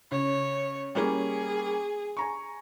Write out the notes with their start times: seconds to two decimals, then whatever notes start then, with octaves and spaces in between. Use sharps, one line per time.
0.11 C#3 C#5
0.95 G3 A#3 C#4 G#4
2.17 G#5 A#5 C#6